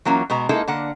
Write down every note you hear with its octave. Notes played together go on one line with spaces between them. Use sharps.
E3 F#3 A#3 C#4 F4
B2 G#3 B3 A#5
G#3 A#3 D#4 E4 G#4 A4
D3 A#3 F#5